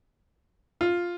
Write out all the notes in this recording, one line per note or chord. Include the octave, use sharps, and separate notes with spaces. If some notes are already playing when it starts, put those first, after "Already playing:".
F4